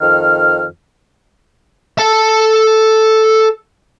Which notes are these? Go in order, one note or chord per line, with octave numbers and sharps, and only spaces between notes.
F2 D#3 F6
A4 A5